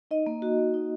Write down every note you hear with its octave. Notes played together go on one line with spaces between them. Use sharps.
D#4 D#5
A#3
F#4
A#3
D#4